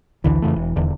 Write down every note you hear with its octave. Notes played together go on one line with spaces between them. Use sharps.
A1 D2 D3 E3
F2 C#3 A3
E1
D#1 E2 D3